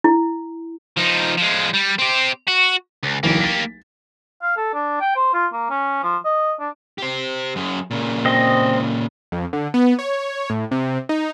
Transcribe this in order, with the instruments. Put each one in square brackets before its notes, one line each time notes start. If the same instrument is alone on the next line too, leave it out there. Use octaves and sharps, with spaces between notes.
[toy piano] E4
[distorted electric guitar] F3 D#4
F3 G#3
G3
C4 G4
F#4
C#2
[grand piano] D1 B1 E3 [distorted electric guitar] A#3 G4
[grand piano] A6 B6
[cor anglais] F5
A4
D4
G5
C5
F4
A#3
C#4
F3
D#5
D4
[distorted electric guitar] G4 C5
F#2 G#4
A#2 C#3
[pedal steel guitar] C4 D#5
[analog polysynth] F2
D3
B3
C#5
A2
C3
D#4